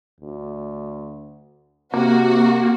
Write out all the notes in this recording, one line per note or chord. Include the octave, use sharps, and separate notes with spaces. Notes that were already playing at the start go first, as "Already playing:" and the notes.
D2
C3 A#3 F#4